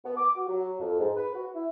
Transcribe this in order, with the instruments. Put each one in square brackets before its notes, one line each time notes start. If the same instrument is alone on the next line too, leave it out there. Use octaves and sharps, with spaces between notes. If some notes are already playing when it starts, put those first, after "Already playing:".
[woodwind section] B3
D6
F#4
F#3
F2
G#2
B4
F#4
E4